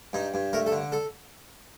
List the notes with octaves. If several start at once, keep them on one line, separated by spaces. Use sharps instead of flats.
G2 D#4
G2
A3 A#4
A4
D3
A4